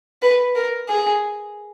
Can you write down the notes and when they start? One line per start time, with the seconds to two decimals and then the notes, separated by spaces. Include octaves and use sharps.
0.22 B4
0.55 A#4
0.88 G#4